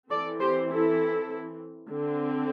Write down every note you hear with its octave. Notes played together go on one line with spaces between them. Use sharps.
E3 C4 A4 D5
G4 C5
E4 A4
D3 C4